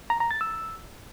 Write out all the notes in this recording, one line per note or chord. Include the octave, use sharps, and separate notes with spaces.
A#5
A#5
A6
E6